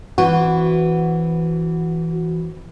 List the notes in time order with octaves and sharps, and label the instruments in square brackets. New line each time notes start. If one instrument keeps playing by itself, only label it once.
[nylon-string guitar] E3 C4 [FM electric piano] F#4